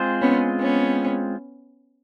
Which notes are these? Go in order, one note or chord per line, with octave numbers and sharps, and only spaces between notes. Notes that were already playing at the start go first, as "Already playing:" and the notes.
Already playing: G#3 C4 F4 G#4 C5
B3 C#4
B3 C#4